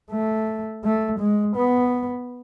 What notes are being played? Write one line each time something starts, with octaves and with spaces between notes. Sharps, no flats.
A3
A3
G#3
B3